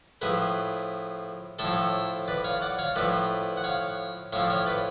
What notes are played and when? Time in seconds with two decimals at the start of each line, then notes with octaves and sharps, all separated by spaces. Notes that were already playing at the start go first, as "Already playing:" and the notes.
0.21 A2 F3 G#4 B4
1.59 A2 F3 A4 C#5
2.28 B4 D5
2.44 C#5 F5
2.62 D5 F#5
2.79 C#5 F5
2.96 A2 F3 B4 D5
3.57 F#5
3.64 C#5 F5
4.33 A2 F3 C#5 F5
4.44 D5
4.50 C#5 F5
4.66 B4 D5